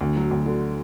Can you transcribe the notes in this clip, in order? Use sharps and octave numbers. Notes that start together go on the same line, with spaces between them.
D2
F#3
D2
D3